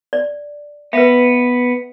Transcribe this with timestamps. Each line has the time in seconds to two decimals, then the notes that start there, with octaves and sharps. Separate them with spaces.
0.13 D5
0.93 B3 B4 E5